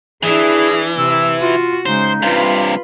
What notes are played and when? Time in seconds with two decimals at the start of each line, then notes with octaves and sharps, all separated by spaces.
0.23 E3 D4 E4 G#4
0.98 C3 E6
1.42 F4 F#4
1.86 C#3 G#3 D#4 C5
2.23 G2 C3 F4 B4